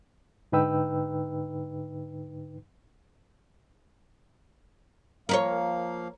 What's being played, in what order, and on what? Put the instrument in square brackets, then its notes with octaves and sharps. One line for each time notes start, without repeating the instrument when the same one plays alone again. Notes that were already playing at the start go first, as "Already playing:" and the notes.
[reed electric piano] G#2 D3 D#4 B4 G5 E6
[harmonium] F3 A#3 F5 [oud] A#4 B4 C#5